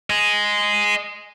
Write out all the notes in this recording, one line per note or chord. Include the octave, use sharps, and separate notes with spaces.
D#5 G#5